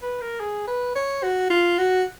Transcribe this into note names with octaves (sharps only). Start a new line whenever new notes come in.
B4
A#4
G#4
B4
C#5
F#4
F4
F#4